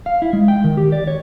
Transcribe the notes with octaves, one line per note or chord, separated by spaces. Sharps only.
F5
E4
G#3
G5
D#3
G4
D5
C#5